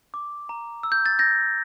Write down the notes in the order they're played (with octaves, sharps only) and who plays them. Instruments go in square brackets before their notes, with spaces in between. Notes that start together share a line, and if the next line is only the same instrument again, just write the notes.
[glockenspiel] D6
A#5
E6
G6
A6
G6 A#6